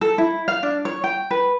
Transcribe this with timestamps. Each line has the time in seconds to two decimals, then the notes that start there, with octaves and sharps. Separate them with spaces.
0.01 A4
0.18 E4
0.48 F5
0.63 D4
0.85 C#5
1.04 G5
1.31 B4